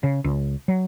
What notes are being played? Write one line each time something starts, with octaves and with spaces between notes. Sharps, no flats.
C#3
C#2
F#3